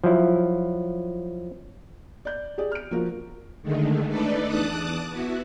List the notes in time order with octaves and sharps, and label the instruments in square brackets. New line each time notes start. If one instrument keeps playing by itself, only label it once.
[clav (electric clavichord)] F3 F#3 E4
[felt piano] D5 G6
G4 G#4 D5
F6 D7
F3 A#3 F#4 A#4
[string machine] D3 D#3 G#3 A3
A3 D4 D#4 A4 B4 D5
E2 A5 D6 D#6 F#6
B3 E4 F#4